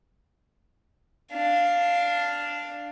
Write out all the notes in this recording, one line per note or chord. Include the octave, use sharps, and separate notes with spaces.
D4 F5